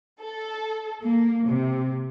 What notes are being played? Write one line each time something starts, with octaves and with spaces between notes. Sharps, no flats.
A4
A#3
C3